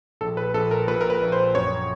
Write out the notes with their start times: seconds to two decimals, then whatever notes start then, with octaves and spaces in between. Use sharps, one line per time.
0.21 A#1 A4
0.37 B4
0.54 A#1 A4
0.71 A#4
0.88 A#2 B4
1.01 A#4
1.10 B4
1.21 A#1
1.32 C5
1.55 F#2 C#5